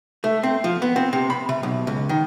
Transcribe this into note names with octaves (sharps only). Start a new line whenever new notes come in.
A3
C4
F3
B3
C4
C3
B5
C3
B1
C#2
D#3